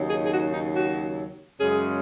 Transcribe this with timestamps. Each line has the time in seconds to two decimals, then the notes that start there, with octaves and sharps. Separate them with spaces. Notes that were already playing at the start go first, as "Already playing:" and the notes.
Already playing: D#2 C#3 F#3 D#4
0.10 G#4
0.23 G#4
0.31 F#4
0.52 D#4
0.74 F#4
1.59 F#2 C#3 G#3 C#4 G#4